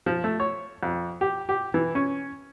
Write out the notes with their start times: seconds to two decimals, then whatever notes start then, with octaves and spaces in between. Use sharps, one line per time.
0.06 F3
0.24 A3
0.40 C#5
0.83 F2
1.21 G4
1.49 G4
1.74 E3
1.95 C#4